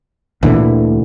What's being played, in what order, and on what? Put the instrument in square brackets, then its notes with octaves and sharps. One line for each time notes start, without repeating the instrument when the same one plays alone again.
[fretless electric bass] D2 D3 E3 [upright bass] A#2 C4